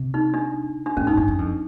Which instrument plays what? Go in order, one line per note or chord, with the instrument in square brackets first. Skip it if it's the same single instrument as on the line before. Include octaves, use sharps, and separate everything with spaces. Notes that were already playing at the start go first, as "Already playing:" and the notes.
Already playing: [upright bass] C3
[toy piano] D#4
D4
D4
[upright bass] A2 [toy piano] C#4
[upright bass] G#2 [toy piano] D#4
[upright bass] G2 [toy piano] D4
[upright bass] F#2
F2